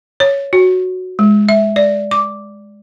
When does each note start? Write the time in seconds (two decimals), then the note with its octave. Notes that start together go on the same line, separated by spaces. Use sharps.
0.20 C#5
0.53 F#4
1.19 G#3
1.49 E5
1.76 D5
2.11 D6